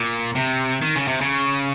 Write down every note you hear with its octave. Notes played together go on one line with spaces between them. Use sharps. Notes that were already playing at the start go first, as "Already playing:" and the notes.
Already playing: A#2
C3
D#3
C#3
C3
C#3